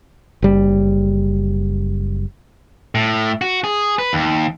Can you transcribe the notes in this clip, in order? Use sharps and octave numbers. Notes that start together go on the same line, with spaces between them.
F#1 G3
A2
F#4
G#4
B4
D#2